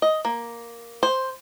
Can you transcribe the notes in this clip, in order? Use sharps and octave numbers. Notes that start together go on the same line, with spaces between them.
D#5
A#3
C5